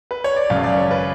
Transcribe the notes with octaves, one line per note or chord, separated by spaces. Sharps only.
B4
C#5
D5
G#1 F#2 C#3 F5
D5
C#5
B4